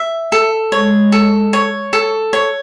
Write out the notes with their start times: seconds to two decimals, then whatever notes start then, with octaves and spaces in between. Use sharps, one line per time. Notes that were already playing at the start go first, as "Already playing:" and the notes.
Already playing: E5
0.32 A4
0.72 G#3 C#5
1.12 A4
1.53 C#5
1.93 A4
2.33 C#5